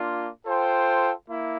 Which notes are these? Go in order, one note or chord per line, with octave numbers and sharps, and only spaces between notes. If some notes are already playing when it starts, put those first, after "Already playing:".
Already playing: A#3 D4 F4
F4 A4 C5 G5
A#3 E4